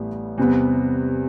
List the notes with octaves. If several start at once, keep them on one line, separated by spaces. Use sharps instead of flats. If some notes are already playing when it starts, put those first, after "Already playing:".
Already playing: A1 A2 G3 B3 E4
E2 C3 G3 B3